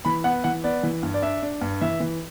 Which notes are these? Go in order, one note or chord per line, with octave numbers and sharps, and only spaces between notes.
E3 B5
B3 F#5
E3 F#5
B3 D5
E3
G2
D5
D4 E5
D4
G2
E3 E5
E3